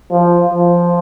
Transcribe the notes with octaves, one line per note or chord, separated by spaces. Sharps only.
F3
F3